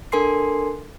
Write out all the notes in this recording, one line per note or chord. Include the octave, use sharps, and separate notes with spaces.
D4 A4 A#4 G#5 C6 C7